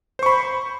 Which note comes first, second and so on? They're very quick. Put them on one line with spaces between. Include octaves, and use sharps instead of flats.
C5 C#6 B5